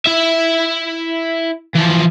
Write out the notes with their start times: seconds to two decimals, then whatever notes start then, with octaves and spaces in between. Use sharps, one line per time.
0.06 E4 E5
1.75 E3 F3